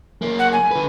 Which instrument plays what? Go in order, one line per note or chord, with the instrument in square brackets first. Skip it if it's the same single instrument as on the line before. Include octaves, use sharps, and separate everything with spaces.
[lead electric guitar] F#2 A#3
[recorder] F#5
G#5
[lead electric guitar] D3 B4